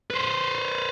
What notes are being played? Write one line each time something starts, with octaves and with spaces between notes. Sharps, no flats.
B4 C5